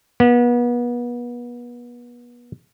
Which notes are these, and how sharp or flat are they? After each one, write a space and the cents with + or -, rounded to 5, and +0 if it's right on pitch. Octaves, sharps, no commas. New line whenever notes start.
B3 -35